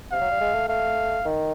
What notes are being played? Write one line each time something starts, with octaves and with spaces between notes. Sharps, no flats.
C3 F5
F#3
G3
G#3
A3
A3 F5
D#3